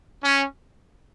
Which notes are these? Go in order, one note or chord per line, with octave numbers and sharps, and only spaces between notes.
C#4